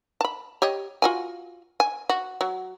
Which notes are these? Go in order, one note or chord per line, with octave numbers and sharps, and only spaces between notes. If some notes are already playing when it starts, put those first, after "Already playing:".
A5 B5
G4 C#5 D#5
F4 F#4 G#5
G#5
F#4
F#3